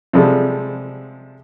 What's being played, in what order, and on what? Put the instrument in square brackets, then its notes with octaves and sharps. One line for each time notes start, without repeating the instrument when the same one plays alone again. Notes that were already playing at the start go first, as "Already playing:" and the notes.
[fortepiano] C3 F3 G3 G#3 A4